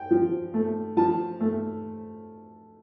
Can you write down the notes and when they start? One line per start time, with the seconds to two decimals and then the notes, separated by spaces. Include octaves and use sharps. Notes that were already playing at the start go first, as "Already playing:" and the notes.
Already playing: G5
0.11 F3
0.54 A3
0.97 F3 A5
1.41 A3